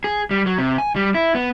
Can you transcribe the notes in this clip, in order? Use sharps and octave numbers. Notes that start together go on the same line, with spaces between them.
G#4
G3
F#3
C3
G#5
G3
E4
B3